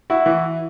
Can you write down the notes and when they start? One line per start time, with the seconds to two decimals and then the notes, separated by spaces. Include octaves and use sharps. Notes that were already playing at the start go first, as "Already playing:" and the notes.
0.10 E4 F#4
0.26 E3